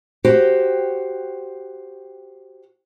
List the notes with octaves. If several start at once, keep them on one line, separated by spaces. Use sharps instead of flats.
F#4 G4 C5 G5